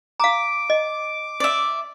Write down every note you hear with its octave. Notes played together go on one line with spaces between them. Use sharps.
F5 A#5 D6
D#5
D5 E5